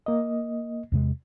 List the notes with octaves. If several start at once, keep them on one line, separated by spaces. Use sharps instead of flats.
A#3 D#5
E2 C3 G#3